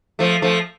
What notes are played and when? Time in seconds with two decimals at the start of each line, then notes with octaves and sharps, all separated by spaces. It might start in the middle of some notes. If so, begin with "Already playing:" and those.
0.19 F3 A3
0.42 F3 A3